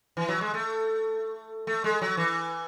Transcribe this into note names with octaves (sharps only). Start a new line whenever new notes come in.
E3
F#3
G#3
A3
A3
G#3
F#3
E3